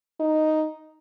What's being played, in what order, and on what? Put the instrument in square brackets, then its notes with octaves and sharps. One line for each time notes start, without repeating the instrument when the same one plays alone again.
[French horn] D#4